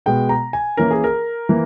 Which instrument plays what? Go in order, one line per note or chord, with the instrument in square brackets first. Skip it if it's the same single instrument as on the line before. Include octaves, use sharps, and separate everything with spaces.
[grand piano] B2 G#3 B3 G5
A#5
G#5
E3 A#3 C#4 A#4
G#4
A#4
E3 A#3